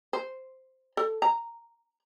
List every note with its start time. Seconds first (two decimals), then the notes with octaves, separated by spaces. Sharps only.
0.13 C5
0.97 A4
1.22 A#5